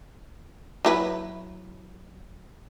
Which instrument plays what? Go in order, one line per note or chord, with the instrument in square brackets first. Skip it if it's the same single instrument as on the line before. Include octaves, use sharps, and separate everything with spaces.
[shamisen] F#3 E4 B4